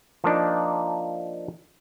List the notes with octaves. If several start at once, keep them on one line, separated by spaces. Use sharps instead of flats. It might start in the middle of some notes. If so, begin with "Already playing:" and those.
F3 A#3 D4 D#4